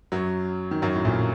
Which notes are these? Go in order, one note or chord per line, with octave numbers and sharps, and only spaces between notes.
F#2 F#3
D#3
F#2 F#3
A2
A#1 A#2